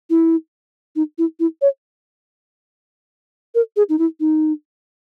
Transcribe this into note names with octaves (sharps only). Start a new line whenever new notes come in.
E4
D#4
E4
E4
C#5
A#4
G#4
D#4
E4
D#4